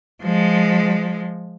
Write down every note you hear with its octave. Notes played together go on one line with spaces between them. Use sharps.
F3 G#3